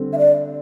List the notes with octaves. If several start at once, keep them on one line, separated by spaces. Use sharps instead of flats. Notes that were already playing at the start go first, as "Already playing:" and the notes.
Already playing: D3 G3 C4
E5
D5